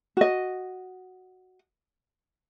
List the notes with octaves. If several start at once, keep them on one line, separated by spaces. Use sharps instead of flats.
F#4 D#5